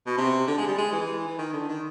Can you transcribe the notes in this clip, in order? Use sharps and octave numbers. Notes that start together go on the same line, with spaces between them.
B2
C3
D3
G#3
G3
G#3
E3
E3
D#3
D3
D#3